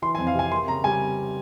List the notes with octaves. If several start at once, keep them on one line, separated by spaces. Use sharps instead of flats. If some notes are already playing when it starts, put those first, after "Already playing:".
E3 C6
G#5
F2
F5
C3 G#5
A#3 C6
C#3 A#5
G3 G#5